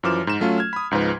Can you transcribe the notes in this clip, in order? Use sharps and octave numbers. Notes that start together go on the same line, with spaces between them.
F#2 E3 F3 D6 F6 E7
G#2 E7
F#3 A3 C#4 F4
F6 G#6
B5 D#6
C#2 G#2 F3 B4